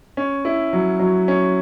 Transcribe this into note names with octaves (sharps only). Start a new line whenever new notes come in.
C#4
E4
F#3
F#3
C#4